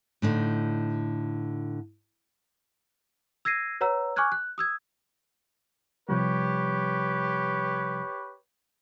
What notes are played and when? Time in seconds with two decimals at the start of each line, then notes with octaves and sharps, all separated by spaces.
0.22 A2 D3 D#4
3.45 E6 G#6 A#6 C7 D#7
3.81 B4 C#5 F#5 A#5 E6
4.16 G#5 C#6 D6 F6 F#6 G#6
4.32 F#6
4.58 D#6 E6 G#6
6.09 C3 F3 G3 G4 B4 C#5